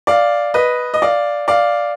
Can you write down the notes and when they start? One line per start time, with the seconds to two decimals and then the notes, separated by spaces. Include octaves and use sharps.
0.07 D5 F5
0.54 B4 D#5
0.94 D#5
1.02 D5 F5
1.48 D5 F5